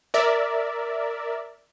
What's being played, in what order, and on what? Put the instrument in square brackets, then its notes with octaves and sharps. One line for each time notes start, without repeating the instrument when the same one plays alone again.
[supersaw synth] A#4 D5 E5